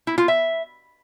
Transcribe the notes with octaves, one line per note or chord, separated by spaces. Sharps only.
E4
F4
E5